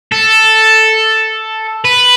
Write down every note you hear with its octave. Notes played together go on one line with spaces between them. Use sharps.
A4
B4